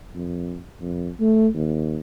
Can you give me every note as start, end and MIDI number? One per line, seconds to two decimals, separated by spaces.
0.14 0.58 41
0.81 1.09 41
1.20 1.48 57
1.54 2.00 39